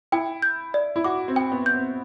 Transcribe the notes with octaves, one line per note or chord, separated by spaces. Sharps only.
E4 G5
G6
D5
E4
F#4 D6
C4
G5
B3
G6
C4